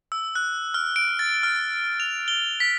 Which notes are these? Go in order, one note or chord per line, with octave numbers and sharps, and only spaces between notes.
E6
F#6
F6
D7
A6
F6
F7
G7
B6